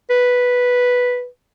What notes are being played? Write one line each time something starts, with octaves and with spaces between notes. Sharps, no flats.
B4